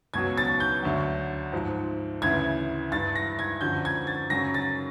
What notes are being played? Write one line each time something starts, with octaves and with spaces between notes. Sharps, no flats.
C#2 B2 F#3 G#6
A6
G6
D2 D3 F#3
G#2 F3
D2 C#3 E3 G#6
G2 E3 A6
A#6
G#6
F#2 D3 F3 G6
G#6
A6
F#2 C#3 F#3 A#6
A6